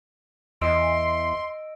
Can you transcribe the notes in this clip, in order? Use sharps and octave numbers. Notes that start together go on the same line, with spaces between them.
E2 D#5 C6 E6 D7